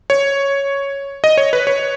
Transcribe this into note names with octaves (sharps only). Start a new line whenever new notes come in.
C#5
D#5
C#5
B4
C#5